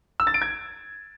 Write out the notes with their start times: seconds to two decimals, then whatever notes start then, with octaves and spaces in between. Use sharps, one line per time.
0.20 E6
0.27 A6
0.34 D7
0.42 G#6